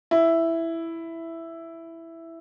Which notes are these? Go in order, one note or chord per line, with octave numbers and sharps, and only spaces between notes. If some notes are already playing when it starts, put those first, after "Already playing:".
E4